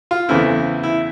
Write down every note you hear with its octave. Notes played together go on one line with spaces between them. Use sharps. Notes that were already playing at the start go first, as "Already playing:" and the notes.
F4
E2 C#3 E3 A3 C4 E4
E4